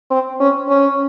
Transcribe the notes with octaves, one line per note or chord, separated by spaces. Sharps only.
C4
C#4
C#4